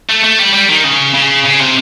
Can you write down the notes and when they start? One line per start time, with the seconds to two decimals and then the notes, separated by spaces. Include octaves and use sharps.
0.10 A3
0.24 A3
0.39 G3
0.54 G3
0.69 D#3
0.84 C#3
1.14 C#3
1.44 C#3
1.59 C3